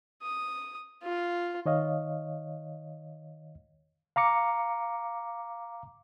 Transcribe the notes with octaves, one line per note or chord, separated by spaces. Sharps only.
D#6
F4
D#3 C#5 D#5 F5
F5 A#5 D6 C#7